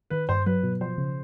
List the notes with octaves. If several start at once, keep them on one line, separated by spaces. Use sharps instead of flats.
D#3 B4
G2 C5
F#3 B4
B2
F3 C5
C#3